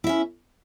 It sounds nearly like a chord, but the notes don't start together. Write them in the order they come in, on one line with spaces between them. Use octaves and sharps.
E4 E5 C#4